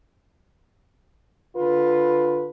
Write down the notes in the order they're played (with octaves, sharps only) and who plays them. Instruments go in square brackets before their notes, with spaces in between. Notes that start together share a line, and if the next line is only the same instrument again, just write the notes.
[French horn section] D3 F4 B4